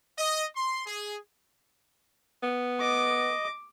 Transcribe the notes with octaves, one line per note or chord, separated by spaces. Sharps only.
D#5
C6
G#4
B3
D#5 D6